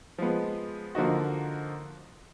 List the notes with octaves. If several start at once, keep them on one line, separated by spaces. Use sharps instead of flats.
F3 G#3 B3
D3 F3 A#3 D#4 F#4